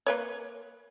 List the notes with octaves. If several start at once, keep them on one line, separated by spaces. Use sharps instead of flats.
A#3 B4 C#5